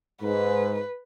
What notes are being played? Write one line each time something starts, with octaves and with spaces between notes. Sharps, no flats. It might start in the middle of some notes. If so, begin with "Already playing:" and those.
G#2 B4